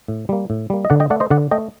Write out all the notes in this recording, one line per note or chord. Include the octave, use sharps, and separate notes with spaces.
A2
G3 A#3
A2
G3 A#3
D#5
D3 D5 F#5
D#5 G5
A3 D5 F#5
C5 D#5
D3 D5 F#5
A3 D#5 G5